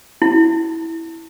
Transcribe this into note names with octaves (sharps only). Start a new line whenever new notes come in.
E4